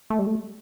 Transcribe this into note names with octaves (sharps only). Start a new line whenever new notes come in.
A3
G3
A3